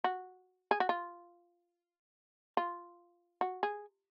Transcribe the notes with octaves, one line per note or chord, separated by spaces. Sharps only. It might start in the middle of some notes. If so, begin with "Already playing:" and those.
F#4
G#4
F#4
F4
F4
F#4
G#4